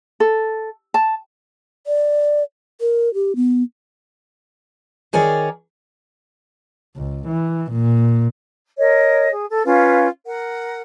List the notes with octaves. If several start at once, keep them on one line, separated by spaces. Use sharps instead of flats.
A4
A5
D5
A#4
G4
B3
D#3 G#4 A#4 C#5 D5
C#2
E3
A#2
A#4 C#5 D#5
G#4
A4
C#4 F4 B4 F5
A#4 F#5